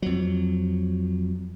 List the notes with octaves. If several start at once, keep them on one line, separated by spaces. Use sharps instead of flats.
F2 F#3